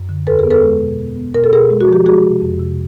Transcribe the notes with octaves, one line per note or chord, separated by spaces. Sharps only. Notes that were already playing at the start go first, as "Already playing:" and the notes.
Already playing: F#2
D3
E2 A4 B4
G#4 A#4
B3
A4 B4
G#3
B2
B3
B3
B2 A#4
A4
B2 G#4 A#4
G#3
F#4
F3 G4
G#3 F#4 G#4
C3
F2
C3